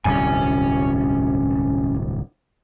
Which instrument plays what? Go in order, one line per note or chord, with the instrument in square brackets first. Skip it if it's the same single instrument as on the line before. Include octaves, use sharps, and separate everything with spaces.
[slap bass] D1 C2 G2 [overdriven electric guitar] C#4 G#5